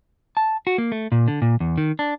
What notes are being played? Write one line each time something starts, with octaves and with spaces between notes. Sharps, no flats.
A5
F#4
A#3
A3
A#2
D3
A#2
E2
D#3
D4